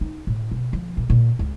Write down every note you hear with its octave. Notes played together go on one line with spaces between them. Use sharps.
D#4
A2
B2
F3
A#2
A#2
C#2